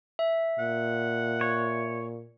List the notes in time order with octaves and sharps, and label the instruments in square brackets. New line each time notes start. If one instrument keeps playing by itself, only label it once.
[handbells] E5
[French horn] A#2 [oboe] F#5
[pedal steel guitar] C#5